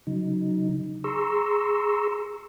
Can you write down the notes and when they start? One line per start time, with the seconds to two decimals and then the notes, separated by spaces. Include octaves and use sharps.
0.07 C#3 F#3 D#4
1.04 G#4 A#5 C6 C#6 E6